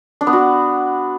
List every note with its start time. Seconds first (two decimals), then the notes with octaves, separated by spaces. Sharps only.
0.21 D4
0.27 B3
0.33 F#4